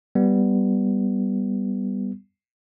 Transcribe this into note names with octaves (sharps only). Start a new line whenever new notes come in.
G3 B3